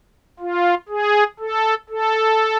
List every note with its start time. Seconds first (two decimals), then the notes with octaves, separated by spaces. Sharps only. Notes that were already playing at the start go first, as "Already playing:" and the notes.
0.40 F4
0.89 G#4
1.40 A4
1.89 A4